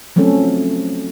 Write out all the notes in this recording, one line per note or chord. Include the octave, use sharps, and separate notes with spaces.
F3 F#3 A3 C4 C#4 A4